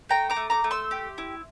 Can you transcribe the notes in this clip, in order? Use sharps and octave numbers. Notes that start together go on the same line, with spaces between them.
A3 G5 A#5
A#5 D6
A3
A#5 D6
A3
C6 E6
G4
E4